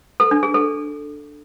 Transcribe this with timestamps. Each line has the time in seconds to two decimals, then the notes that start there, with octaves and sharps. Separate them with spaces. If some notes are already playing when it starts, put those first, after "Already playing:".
0.20 A4
0.31 D4
0.43 G#4
0.54 A4